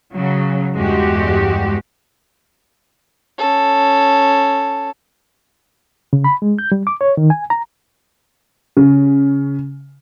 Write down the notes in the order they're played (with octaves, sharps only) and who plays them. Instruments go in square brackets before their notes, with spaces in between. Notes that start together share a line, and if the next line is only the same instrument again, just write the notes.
[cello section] C#3 F#3
E2 G2 G#3 F#4 G4
[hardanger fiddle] C#4 A4
[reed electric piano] C#3
B5
G#3
G6
G3
D6
C#5
D#3
G#5
A#5
[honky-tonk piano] C#3